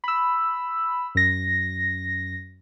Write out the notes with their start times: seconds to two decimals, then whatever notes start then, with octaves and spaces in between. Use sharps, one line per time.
0.04 B5 E6
1.15 F#2 A#6